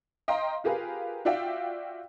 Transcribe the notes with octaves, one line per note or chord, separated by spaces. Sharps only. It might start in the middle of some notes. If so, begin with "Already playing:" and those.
D#5 F5 G5 A#5 C6
F4 G4 G#4 A#4 B4 F5
F4 F#4 D5 E5 F5 G5